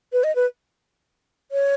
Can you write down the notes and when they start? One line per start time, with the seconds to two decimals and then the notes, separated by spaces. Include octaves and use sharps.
0.13 B4
0.24 D#5
0.36 B4
1.52 C#5